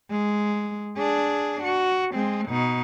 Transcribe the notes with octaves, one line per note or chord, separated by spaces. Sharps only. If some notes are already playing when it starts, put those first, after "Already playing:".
G#3
D4 G#4
F#4
G#3 C4
B2 D#4